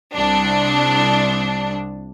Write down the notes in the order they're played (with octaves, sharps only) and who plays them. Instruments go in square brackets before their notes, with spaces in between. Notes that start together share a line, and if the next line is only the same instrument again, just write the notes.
[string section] C2 D4